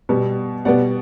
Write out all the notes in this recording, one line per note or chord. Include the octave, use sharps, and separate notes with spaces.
B2 G3 B3
B2 G3 B3 D5 F#5